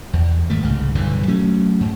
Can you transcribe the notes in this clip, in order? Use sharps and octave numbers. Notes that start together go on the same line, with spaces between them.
E2
G#2 D#3 A3
C2 G#2 C#3
B1 G2 D3 E3
F#3 A3 C#4
G#2